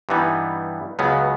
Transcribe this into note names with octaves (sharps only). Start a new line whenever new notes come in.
G2 E3 G3 B3 D#4
C#2 C#3 F#3 B3